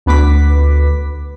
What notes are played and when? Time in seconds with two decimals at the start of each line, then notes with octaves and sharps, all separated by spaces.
0.06 D2 B3 B4 D6 B6